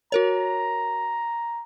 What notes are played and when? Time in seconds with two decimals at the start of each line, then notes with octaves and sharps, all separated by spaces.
0.12 F#4 A#4 C#5 A#5